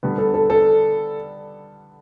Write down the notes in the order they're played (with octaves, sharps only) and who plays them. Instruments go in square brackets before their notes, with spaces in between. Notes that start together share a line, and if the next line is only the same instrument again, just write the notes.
[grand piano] D3 G3 B3
[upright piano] A4
A4
A4